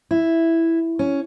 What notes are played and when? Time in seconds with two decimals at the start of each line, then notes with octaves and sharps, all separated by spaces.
0.11 E4
0.99 C#4